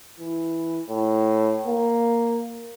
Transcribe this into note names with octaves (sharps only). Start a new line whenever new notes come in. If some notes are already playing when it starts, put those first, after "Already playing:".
E3
A2
A#3